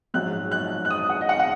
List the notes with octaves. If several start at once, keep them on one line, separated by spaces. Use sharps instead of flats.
A#1 G#2 F#3 F#6
F#6
F#6
D#6
F#5
D#5
F#5
F#5